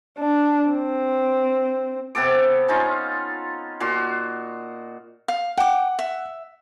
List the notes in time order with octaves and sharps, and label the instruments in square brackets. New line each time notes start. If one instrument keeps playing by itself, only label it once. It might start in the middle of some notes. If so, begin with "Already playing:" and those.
[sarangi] D4
C4
[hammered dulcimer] C3 B3 A4 D6
C#4 D#4 F4
A#2 F#4 C6
[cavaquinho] F5
[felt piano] F#5 [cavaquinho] G5 D6
[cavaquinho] E5